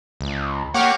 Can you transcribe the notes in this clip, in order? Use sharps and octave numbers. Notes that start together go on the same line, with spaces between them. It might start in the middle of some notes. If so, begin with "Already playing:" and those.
C#2
A#3 G4 C#5 F#5 D6 F6